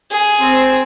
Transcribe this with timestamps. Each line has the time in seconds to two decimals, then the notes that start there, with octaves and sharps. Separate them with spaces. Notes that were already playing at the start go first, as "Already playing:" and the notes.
0.11 G#4
0.40 C4